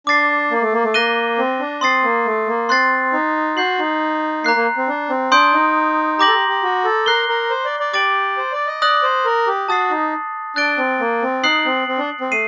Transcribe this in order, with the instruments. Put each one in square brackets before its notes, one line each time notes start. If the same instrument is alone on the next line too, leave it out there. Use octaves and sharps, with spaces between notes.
[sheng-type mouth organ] D4 [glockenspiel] D6 A6 C7
[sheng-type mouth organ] A#3
A3
A#3
A3
[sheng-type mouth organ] A#3 [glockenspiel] F#6 A#6 D#7 G7
[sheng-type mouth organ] C4
D4
[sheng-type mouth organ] C4 [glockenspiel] C6 D#6 A6 C7
[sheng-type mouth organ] A#3
A3
A#3
[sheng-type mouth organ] C4 [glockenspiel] C6 F#6 A6 C7
[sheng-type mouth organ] D#4
[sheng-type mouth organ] F#4 [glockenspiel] G6 C7 F#7
[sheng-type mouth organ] D#4
[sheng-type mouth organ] A#3 [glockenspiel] A#5 F#6 C7
[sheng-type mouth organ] A#3
C4
D4
C4
[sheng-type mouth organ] D4 [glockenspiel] C6 D#6 G6 D7
[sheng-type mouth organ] D#4
[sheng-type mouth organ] G4 [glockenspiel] A#5 D6 G6 A#6 F#7
[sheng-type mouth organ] A4
G4
G4
F#4
A4
[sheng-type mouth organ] A#4 [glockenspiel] F#6 C7 G7
[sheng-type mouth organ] A#4
C5
D5
D5
[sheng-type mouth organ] G4 [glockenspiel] D6 A6 D7 F#7
[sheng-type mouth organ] C5
D5
D#5
[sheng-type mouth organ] D5 [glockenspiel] D#6 F#6 A#6 F#7
[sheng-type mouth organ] C5
A#4
G4
[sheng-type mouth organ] F#4 [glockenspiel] A5 D#6 A6 C7
[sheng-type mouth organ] D#4
[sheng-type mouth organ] D4 [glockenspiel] F#6 A6 D7 G7
[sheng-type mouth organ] C4
A#3
C4
[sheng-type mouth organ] D#4 [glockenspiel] D#6 F#6 C7 F#7
[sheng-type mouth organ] C4
C4
D4
C4
[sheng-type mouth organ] A3 [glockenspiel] C7 D#7